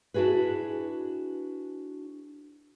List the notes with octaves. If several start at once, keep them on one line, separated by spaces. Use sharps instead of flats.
D4 E4 F#4 G#4 B4